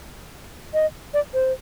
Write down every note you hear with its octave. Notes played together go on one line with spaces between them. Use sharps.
D#5
D5
C5